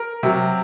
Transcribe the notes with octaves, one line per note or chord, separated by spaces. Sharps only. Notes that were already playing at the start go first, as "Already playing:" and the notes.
Already playing: A#4
C3 F#3